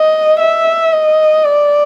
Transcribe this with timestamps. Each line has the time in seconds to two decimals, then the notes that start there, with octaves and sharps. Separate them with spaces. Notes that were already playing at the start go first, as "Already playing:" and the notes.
Already playing: D#5
0.40 E5
0.93 D#5
1.44 D5